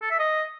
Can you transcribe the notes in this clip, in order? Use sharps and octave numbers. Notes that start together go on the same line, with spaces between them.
A4
E5
D#5